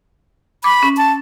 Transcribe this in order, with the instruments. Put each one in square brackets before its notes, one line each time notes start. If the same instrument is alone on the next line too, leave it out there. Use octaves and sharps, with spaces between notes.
[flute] B5 [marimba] D6
[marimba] C#4
[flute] A5